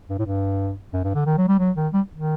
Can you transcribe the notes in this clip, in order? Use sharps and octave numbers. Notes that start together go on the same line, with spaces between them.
G2
A2
G2
F#2
G2
D3
D#3
F#3
G3
F#3
D#3
G3
D#3